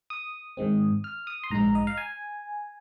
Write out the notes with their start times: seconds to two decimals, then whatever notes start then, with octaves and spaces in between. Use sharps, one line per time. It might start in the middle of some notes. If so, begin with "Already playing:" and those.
0.10 D#6
0.57 G#2 D#3 G#3 C4
1.04 F6
1.27 D#6
1.43 C6
1.51 A#1 G#2 G#3 D#4 A#5
1.75 D#5
1.87 F5
1.97 G#5